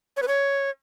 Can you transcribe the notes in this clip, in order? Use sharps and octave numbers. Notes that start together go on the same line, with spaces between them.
C#5
B4
C#5